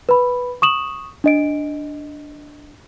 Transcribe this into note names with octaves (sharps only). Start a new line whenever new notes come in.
B4 B5
C#6 D#6 E7 F#7
D4 D#5 D7